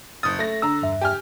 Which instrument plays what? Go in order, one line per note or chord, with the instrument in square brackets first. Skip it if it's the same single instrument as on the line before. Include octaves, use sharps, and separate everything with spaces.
[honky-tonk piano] F#1 D#6 [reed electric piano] A6
[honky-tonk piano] A3 A#6
[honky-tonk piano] D3 A#5 [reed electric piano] E6
[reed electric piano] E2 G2 E5
[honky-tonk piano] G4 G#5 F6